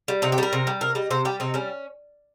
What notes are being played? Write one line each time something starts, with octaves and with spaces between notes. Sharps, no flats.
G3
C3 D#4
G4
G3 A#4
C3
G3
C3 A#4
G3 D#5
C3 C5
G3 G4
C3 D#4
G3 C#4